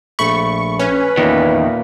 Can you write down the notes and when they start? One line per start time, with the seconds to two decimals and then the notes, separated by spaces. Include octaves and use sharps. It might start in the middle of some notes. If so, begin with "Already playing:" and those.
0.19 A#1 A3 B5 C#6
0.79 C#4 B4
1.17 E2 A#2 D#3 A#3